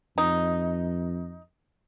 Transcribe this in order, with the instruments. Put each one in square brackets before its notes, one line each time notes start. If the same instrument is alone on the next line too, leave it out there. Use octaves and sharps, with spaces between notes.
[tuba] F2 [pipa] D#4